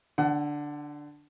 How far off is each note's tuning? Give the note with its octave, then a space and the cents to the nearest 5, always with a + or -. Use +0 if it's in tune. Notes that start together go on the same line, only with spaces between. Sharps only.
D3 +0 F#5 +30